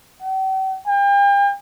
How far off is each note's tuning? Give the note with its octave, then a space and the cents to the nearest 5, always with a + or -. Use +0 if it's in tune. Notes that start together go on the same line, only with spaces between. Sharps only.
G5 -45
G5 +40